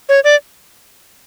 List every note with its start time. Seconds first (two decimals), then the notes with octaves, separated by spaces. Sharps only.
0.09 C#5
0.24 D5